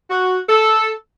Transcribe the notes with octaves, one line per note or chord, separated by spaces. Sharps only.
F#4
A4